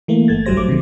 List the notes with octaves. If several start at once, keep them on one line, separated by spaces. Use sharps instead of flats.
E3 A3 A#3
G1 A3 G#6 A6
A#1 G2 F#3 G3 C5 A#6
F#3 A3 D6
C3 D#3